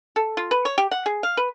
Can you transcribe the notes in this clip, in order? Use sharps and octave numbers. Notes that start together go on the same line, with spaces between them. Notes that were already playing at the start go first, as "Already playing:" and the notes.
A4
F4
B4
C#5
G4
F#5
G#4
F5
B4